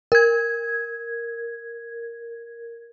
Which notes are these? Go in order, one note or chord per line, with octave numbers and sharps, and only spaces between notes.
A#4 G#6